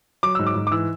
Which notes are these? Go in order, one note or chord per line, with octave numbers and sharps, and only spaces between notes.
F#3 D6
G#2 E6
D6
G#2
D6
E3 E6